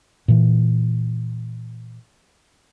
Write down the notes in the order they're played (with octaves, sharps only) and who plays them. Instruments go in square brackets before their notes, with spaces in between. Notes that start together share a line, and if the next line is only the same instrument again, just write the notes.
[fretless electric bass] A#2 E3